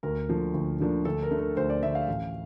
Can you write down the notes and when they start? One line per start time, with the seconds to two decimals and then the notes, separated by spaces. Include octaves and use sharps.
0.03 D2 A#4
0.29 D3 F3 A#3 D4
0.54 D2
0.80 D3 F3 A#3 D4
1.05 D2 A4
1.23 A#4
1.31 D3 A3
1.40 A#4
1.57 D2 C5
1.70 D5
1.82 D3 A3 E5
1.95 F5
2.08 A1